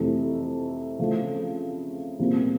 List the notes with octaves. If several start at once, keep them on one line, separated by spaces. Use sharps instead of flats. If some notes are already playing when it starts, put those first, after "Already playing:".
Already playing: F2 C3 E3 A3
C#3 F3 A3 C#4 F4
C2 A#2 F3 A#3